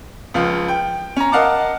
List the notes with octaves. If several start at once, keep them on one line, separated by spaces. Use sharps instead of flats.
C#2 F3 F5
G5
C#4 A#5
A#4 D#5 F5 F#5 A5 D6